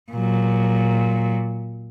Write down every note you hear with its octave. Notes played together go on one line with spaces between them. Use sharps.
A#2 F#3